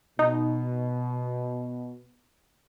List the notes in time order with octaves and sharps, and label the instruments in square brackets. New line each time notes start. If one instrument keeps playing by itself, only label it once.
[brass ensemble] B2 [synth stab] D#4